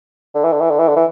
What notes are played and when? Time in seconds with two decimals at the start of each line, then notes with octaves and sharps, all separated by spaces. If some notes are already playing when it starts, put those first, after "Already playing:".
0.34 D3
0.44 E3
0.52 D3
0.60 E3
0.70 D3
0.79 E3
0.87 D3
0.96 E3